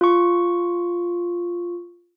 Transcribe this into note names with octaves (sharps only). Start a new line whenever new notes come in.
F4 C#6